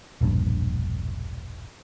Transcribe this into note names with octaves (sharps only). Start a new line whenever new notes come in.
E1 A#1 G2